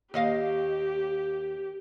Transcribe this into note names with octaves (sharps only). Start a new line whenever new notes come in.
D#2 G4 D#5 F5